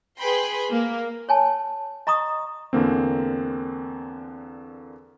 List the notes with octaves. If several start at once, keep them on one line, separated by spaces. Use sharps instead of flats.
G#4 B4 G5 B5 C6
A#3
C#5 G#5 A5
D#5 A#5 C#6 D#6
E2 D3 A#3 C4